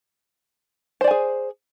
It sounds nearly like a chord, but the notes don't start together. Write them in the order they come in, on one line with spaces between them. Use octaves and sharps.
C5 D5 G#5 G#4